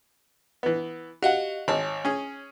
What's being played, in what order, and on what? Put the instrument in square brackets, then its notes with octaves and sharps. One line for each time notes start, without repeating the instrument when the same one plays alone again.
[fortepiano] E3 B3
[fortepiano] F#4 F#5 [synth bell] G4 D#5 F5
[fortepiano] G#1 A5 [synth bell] C#5 G#5
[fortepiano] C#4 G#4